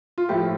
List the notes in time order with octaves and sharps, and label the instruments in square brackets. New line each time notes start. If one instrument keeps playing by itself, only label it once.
[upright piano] F4
A2 F3 A3 G4